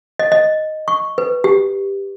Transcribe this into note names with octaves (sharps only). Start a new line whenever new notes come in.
D#5
D#5
C#6
B4
G4